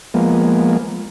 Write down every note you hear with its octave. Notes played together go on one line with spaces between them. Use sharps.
F3 G#3 A#3 B3